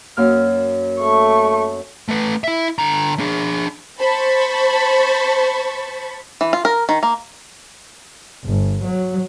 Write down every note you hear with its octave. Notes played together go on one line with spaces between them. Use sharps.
F#2 A#3 F6
A3 C#6
A3 B4
E4 E5
D3 A#5
D4 G#4
C5 A5 B5 C#6
E3
F4
A#4
D#3
A#3
G1
F#3